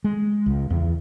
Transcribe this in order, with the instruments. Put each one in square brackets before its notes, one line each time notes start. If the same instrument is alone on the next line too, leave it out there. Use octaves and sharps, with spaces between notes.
[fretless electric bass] G#3
C#2
E2